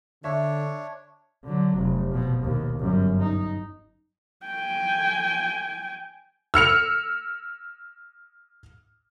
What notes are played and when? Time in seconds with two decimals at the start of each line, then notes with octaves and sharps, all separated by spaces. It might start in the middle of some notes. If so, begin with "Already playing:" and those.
0.24 D3 D4 C#5 E5
1.44 D3 F#3
1.77 F1
2.11 B2 F3
2.43 D#2 B2
2.80 G1 F#2
3.21 D#4
4.46 G5 G#5
6.54 E6 F6 C#7 F7